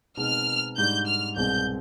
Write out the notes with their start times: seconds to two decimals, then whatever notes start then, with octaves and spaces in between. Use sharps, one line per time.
0.17 B2 G#3 C4 D#4 F6
0.77 G#2 G3 D4 G6
1.07 F6
1.36 C2 B2 G#3 C4 G6